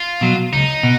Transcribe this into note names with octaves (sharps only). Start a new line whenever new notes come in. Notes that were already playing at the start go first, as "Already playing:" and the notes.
Already playing: F4
B2 F#3
C#2 D#4
B2